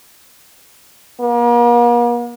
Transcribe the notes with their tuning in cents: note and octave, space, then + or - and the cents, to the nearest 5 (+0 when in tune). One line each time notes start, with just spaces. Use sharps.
A#3 +45